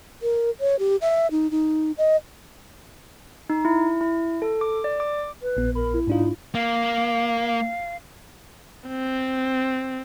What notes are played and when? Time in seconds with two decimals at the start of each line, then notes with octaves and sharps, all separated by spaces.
0.22 A#4
0.60 C#5
0.79 G4
1.02 E5
1.31 D#4
1.51 D#4
1.98 D#5
3.50 D#4
3.65 E4
4.01 E4
4.42 A4
4.61 D6
4.84 D5
5.00 D6
5.42 B4
5.57 A#1 B3
5.75 A#4 B5
5.94 E4
6.07 G#2 D4 D#4 F4
6.55 A#3 F5
8.88 C4